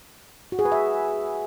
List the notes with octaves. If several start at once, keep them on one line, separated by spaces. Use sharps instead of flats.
F#4
G#4
B4
E5